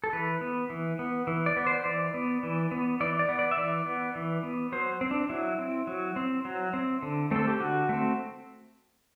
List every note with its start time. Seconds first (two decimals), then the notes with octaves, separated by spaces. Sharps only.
0.04 A4
0.13 E3 B4
0.41 B3
0.70 E3
0.99 B3
1.27 E3
1.46 D5
1.56 B3
1.67 C5
1.85 E3 D5
2.14 B3
2.43 E3
2.71 B3
3.00 E3 D5
3.19 D5
3.29 B3
3.39 D5
3.51 E5
3.57 E3 D5
3.86 B3
4.15 E3
4.43 B3
4.72 F#3 C5
5.01 C4
5.11 D4
5.29 F#3 E4
5.59 C4
5.87 F#3
6.16 C4
6.45 F#3
6.74 C4
7.02 D3
7.31 A3 C4 A4
7.47 G4
7.60 D3 F#4
7.89 A3 C4